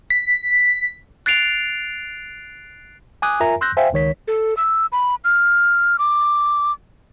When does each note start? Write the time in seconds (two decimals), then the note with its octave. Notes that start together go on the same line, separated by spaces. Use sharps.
0.10 B6
1.26 F#6 A6 C7 D7 F7
3.22 G#5 D6 D#6 F#6 G#6
3.40 F4 A#4 E5 G#5 A#5
3.61 C6 E6 F#6 G6 A#6
3.77 C5 E5 F5 G5 G#5
3.93 C#2 D#3 C#5 B6
4.28 A4
4.57 E6
4.92 B5
5.24 F6
5.99 D6